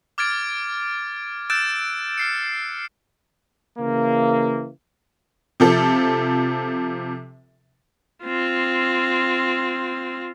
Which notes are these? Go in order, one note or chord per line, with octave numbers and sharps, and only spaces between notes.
D6 F6 G#6 A6 D7
E6 F#6 G6 A6 D7 E7
F6 C7 C#7
C#3 E3 A#3
C3 F3 A4
C4 F4